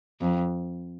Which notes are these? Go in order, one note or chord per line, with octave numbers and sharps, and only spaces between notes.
F2